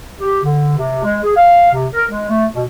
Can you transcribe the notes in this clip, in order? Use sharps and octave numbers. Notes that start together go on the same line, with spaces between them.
G4
D3
C3
G#3
G#4
F5
C3
A#4
G#3
A3
B2